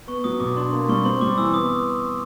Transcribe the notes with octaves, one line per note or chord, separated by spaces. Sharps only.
B3 C#6
F#3 D#6
B2 D6
D4 C6
A#3 C6
G3 C#6
C4 C6
G3 D6
E3 E6
B3 D#6